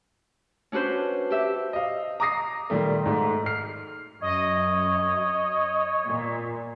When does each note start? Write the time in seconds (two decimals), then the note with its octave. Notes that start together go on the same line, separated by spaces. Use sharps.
0.72 C#4 D4 F#4 B4 C5
1.30 G4 E5
1.73 D#5 F5
2.20 A#5 D6 D#6 A#6 C7
2.70 A#2 D#3 G3 A3
3.06 G#2 A3
3.46 F6 C7
4.22 F#2 C#5 D#5
6.06 A#2